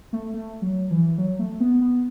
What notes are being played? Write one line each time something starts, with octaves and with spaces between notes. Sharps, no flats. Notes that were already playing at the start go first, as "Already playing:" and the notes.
A3
A3
F#3
E3
F#3
A3
B3
B3